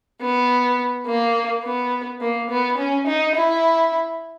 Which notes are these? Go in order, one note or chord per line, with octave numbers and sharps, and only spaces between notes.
B3
A#3
B3
A#3
B3
C#4
D#4
E4